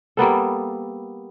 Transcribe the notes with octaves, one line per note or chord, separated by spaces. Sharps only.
G3 A#3 B3 A4